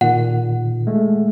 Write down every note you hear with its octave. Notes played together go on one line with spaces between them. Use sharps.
A#2 D#3 F#5
G#3 A3